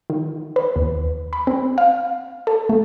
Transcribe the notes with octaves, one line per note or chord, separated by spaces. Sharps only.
D#3
B4
D#2
B5
C4
F5
A4
A3